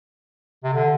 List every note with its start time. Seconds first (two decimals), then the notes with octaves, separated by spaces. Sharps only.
0.64 C3
0.74 D3